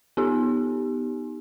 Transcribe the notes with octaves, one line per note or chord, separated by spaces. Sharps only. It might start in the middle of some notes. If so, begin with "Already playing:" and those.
B3 D#4 G4